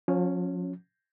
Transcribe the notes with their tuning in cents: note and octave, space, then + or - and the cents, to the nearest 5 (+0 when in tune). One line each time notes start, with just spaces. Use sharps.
F3 +40 C#4 +0